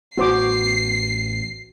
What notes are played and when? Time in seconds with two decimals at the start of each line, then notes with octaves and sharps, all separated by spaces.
0.18 A1 B3 F#4 C5 D6 C7